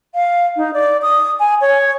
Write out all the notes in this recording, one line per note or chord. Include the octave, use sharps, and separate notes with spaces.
F5
D#4
D5
D#6
G#5
C#5